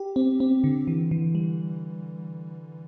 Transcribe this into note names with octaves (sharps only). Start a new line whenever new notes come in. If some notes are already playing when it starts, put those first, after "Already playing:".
Already playing: G4
C4
C4
D3
E3
E3
G3